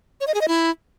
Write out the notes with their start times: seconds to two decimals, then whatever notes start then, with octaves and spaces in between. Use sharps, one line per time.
0.21 C#5
0.27 D#5
0.34 G#4
0.41 D#5
0.48 E4